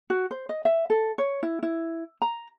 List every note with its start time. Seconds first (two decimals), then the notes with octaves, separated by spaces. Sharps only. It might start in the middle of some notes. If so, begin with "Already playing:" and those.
0.10 F#4
0.31 C5
0.49 D#5
0.65 E5
0.90 A4
1.18 C#5
1.43 E4
1.63 E4
2.22 A#5